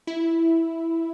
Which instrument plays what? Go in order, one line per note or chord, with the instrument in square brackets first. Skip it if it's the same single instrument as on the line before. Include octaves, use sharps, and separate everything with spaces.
[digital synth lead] E4